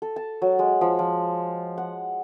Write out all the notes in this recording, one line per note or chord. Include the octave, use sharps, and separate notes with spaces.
A4
A5
F#3
G#3
F3
F3
F#5